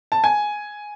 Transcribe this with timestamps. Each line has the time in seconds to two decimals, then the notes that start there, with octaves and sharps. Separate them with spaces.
0.12 A5
0.24 G#5